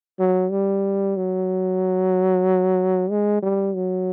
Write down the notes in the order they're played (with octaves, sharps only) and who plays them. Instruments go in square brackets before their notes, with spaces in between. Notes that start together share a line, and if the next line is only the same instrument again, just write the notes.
[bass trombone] F#3
G3
F#3
G#3
G3
F#3